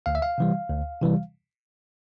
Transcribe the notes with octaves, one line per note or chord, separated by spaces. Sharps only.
D2 F5
E5
F5
C3 E3 G3
D2
C3 E3 G3